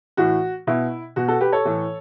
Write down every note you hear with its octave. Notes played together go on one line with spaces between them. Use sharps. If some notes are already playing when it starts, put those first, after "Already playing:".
A2 E3 F#4
B2 E4
B2 F#4
F#4 A4
G4 B4
A4 C#5
A2 E3